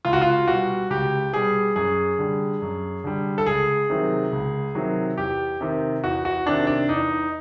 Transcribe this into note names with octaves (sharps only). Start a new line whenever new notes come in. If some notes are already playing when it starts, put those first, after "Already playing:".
C#2 F4
F#4
F4
B2 G3 F#4
C#2 G4
B2 G3 G#4
F#2 G#4
D3 G3
F#2
D3 G3
A4
C#2 G#4
C3 D#3 F#3
C#2
C3 D#3 F#3
E2 G4
C3 D#3
E2 F#4
F#4
C3 D#3 D4
D4
E2 D#4